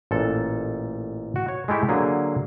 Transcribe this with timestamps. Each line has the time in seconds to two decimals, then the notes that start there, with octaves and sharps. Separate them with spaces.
0.11 A1 A#2 A4
1.36 F#4
1.48 C#5
1.68 G#3 A3 E4 G4
1.88 D3 F#3 A#3 G#4